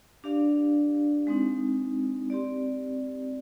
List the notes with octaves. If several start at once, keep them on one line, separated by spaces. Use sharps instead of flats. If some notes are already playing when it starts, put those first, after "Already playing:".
D4 G4 D5 F5
G#3 C4 D#4
C4 G4 D5